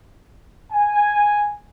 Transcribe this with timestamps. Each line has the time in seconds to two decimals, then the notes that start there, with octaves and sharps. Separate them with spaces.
0.72 G#5